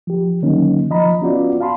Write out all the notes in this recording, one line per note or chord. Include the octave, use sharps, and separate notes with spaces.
F3 G4
D3 D#3 F#3 A#3 C#4 D#4
F3 D#5 A#5 B5
B3 C#4 F4 F#4 D5
F5 A5 B5 C6